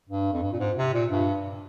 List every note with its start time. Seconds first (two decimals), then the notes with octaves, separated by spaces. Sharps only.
0.09 G2
0.33 F2
0.43 G2
0.52 A#2
0.60 G#2
0.78 C3
0.93 A#2
1.11 G2